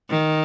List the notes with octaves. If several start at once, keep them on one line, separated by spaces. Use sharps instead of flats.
D#3